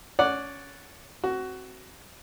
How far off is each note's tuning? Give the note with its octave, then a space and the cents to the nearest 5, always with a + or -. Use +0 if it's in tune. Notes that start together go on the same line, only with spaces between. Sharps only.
C#4 +15 D5 +0 F#5 -5
C4 +5 F#4 +15